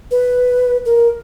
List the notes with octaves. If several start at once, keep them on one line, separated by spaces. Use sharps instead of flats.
B4
A#4